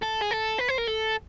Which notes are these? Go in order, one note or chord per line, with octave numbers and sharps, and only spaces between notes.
A4
G#4
A4
B4
C5
A#4
A4